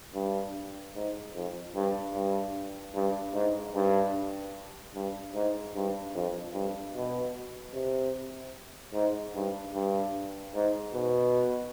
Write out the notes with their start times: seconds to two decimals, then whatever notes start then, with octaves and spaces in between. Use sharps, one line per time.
0.15 G2
0.95 G#2
1.35 F2
1.75 G2
2.14 G2
2.95 G2
3.34 G#2
3.75 G2
4.94 G2
5.35 G#2
5.75 G2
6.15 F2
6.54 G2
6.95 B2
7.74 C3
8.94 G#2
9.35 G2
9.74 G2
10.55 G#2
10.94 B2